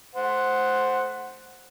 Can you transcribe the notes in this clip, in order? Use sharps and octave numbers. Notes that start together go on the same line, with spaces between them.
C5 F#5